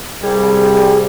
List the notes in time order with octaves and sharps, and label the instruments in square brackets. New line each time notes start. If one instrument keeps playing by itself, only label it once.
[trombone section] C2 G3 [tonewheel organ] G#4